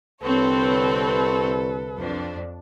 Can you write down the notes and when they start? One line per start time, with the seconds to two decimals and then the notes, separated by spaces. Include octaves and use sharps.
0.23 C2 D3 C4 A4 B4 C#5
1.98 F2 D4